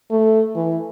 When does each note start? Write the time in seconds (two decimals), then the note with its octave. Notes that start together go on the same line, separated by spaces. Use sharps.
0.11 A3
0.56 E3